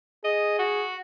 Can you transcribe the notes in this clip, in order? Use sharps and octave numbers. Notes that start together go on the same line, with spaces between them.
G#4 D#5
F#4